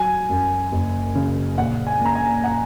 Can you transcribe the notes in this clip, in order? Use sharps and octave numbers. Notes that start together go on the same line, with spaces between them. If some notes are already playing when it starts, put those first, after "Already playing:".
Already playing: F#3 G#5
F#2
F#1
C#3
A#1 F#5
G#5
A#2 A#5
G#5
F#5